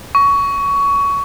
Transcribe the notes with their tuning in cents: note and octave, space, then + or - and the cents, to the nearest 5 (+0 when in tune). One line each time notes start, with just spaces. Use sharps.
C#6 +20